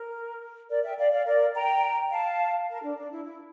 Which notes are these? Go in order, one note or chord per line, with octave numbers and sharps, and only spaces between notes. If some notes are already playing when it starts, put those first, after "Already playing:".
Already playing: A#4
A#4 D5
E5 G5
D5 F5
D5 F5
A#4 D5
G5 A#5
F5 A5
A#4
D4
D4
E4
E4